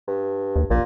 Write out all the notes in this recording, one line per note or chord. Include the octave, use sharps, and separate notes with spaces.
G2
D#2
A#1 A#2